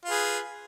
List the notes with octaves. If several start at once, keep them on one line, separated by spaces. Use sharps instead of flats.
F4 G#4 B4